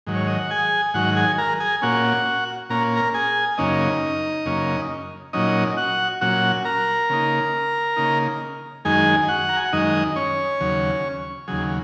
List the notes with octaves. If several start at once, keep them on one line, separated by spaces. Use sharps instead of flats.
G#2 D#3 F#3
C#5
D#5
F#5
G#4 G#5
G#2 D#3 F#3 F#4 F#5
G#4 G#5
A#4 A#5
G#4 G#5
A#2 A#3 C#4 F#4 F#5
A#2 A#3 C#4 A#5
A#4 A#5
G#4 G#5
F#2 C#3 A#3 C#4 D#4 D#5
F#2 C#3 A#3 C#4
A#2 F#3 C#4 D#4 D#5
F#4 F#5
A#2 F#3 C#4 F#4 F#5
A#4 A#5
C#3 A#3 D#4
C#3 A#3 D#4
F#2 D#3 G#3 D#4 G#4 G#5
F#4 F#5
A#5
G#5
F#5
F#2 D#3 G#3 D#4 D#5
C#4 C#5
D#2 C#3 F#3
D#2 C#3 F#3 G#4